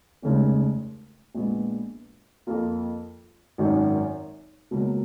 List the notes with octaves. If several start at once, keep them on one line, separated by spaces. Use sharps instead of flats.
F1 D#2 C#3 G#3
A#1 A#2 G#3 B3
F2 F3 A#3 F4
G#1 F#2 D#3
C#2 B2 F#3 A#3